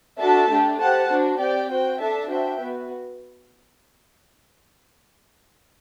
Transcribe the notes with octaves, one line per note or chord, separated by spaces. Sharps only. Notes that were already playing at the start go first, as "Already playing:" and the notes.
D4 F#4 A4 E5 A5
A3 D4 G4
G4 C5 F#5 A5
D4 F#4 C5
C4 G4 D5 G5
F#4 C5 G5
D4 A4 E5 A5
D4 F#4 C5 E5 G5
B3 F#4 B4